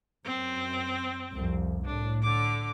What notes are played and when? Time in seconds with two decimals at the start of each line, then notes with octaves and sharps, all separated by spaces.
0.25 F#2 C4
1.33 C2 F2
1.85 A2 D4
2.23 D3 D6